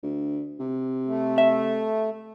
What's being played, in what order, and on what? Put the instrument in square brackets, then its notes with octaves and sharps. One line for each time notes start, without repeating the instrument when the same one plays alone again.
[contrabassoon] D2
C3
[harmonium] A3
[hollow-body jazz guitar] E5